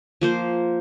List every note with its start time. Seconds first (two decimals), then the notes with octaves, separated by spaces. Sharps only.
0.21 F3 A#3 C5